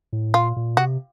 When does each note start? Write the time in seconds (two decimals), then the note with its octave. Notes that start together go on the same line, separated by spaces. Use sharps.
0.13 A2
0.34 A#2 F4
0.56 A#2
0.77 C3 F#4